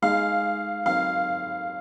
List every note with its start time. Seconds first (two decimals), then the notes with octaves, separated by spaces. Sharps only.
0.02 G#3 D#4 G#4 F5
0.86 F#3 C4 D#4 A#4 F5